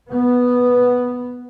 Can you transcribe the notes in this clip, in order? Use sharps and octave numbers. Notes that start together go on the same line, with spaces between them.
B3